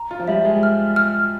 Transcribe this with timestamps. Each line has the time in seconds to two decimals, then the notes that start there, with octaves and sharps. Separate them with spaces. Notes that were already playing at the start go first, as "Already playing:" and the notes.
Already playing: A#5
0.11 F4
0.20 F3
0.28 G3 E5
0.45 G#3
0.63 F6
0.96 F6